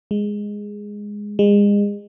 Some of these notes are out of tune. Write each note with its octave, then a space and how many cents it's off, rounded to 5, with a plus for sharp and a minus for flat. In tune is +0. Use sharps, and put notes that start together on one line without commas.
G#3 -5
G#3 -30